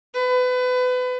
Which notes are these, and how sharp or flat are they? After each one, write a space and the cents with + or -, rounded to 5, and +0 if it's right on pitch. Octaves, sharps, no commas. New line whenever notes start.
B4 +30